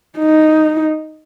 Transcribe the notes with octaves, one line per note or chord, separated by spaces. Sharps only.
D#4